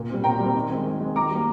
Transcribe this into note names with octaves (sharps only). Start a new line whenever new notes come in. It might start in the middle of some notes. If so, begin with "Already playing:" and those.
Already playing: A#2
G3 C4
A#2 G5 A#5
G3
C4
D#3
C4
G#3
D#3
G#3 C4
D#3 A#5 D6
G3 A#3